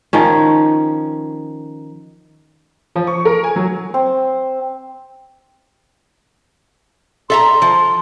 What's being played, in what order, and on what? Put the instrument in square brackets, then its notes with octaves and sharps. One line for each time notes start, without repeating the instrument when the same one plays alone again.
[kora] D#3 F3 C#4
[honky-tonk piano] F3
C#6
A#4
G#5
F#3
[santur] C4
[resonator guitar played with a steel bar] A4 E5 A#5 [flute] C6
[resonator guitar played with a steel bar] F3